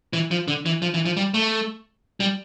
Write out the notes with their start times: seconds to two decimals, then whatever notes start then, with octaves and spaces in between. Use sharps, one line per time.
0.13 E3
0.31 F3
0.48 D3
0.66 E3
0.82 F3
0.94 E3
1.05 F3
1.17 G3
1.34 A3
2.20 G3